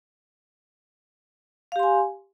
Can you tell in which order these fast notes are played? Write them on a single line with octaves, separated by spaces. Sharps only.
F5 G4 C6 G#5